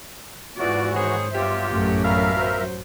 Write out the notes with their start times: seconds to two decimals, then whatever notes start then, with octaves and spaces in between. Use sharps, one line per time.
0.58 E2 G#2 E3 F4 F#4 D5
0.95 D#3 G#4 C5 C#5
1.34 G2 F#3 B3 F4 G4 E5
1.71 A1 F#2 A3 C#4
2.04 B2 D3 A#4 E5 F5
2.34 F#3 C5